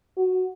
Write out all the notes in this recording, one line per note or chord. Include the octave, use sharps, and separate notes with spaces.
F#4